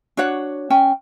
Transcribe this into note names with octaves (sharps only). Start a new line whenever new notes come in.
D4 F#4 C#5 F#5
C#4 G5 G#5